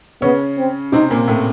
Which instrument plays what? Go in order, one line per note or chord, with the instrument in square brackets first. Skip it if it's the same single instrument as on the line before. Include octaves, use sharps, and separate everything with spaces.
[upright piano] C#3 C#4 [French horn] B3
[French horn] C4
[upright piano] C3 C4 [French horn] D#4
[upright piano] A#2 A#3
A2 A3